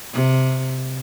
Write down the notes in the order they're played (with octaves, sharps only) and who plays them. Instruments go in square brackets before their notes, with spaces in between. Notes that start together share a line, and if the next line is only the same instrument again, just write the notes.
[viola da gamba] C3